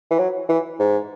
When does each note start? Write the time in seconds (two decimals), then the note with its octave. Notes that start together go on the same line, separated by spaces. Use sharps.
0.11 E3
0.19 F#3
0.49 E3
0.79 G#2